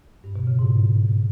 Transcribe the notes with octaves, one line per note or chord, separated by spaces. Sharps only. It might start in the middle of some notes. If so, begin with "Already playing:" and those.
G2
B2
C#3
G#2